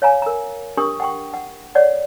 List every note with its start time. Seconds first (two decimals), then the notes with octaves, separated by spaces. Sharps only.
0.02 C#5 F5 G#5 A#5
0.22 A#4 A#5
0.77 D4 G4 A#4 C#6 D#6
1.00 F#5 G5 C#6
1.34 F#5
1.75 C#5 D5 F#5